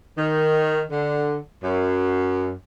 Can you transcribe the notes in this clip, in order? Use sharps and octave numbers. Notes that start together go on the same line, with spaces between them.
D#3
D3
F#2